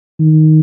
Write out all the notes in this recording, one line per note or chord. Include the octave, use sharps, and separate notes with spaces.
D#3